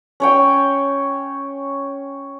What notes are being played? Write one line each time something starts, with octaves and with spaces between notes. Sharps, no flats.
C#4 C#5 G5